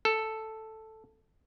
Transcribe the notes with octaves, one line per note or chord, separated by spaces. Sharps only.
A4